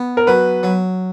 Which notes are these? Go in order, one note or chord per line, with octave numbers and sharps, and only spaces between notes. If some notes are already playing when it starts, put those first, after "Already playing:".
Already playing: B3
A#4
F#3 B4
F#3